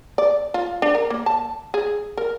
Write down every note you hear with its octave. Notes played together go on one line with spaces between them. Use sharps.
D5
F4
D4
A#4
A#3
A5
G#4
A#4